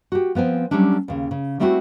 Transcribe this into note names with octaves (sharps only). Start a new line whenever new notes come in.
F#4 G4
F3 B3 C4 G#5
F#3 G3 A3 C#4 D4
D#2 C#3
C#3
G3 A3 C4 D#4 E4 F#4